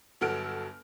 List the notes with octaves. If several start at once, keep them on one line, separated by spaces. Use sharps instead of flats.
G1 F#3 F#4 A4 F6 D7